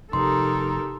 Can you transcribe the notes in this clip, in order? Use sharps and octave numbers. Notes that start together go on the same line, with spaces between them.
F1 D#4 G4 A4 A#4 C6